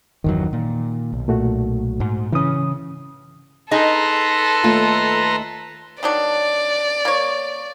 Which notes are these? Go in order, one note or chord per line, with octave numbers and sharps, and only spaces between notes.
G1 E2 D#3 F#3
A#2
B1
A#2 A3 F#4
G#2
C#3 E3 C#4 D#6
D#4 G#4 A4 B4 A#5 C6
D#2 A3 F4
D#3 F#3 D4 D5
A#3 C#5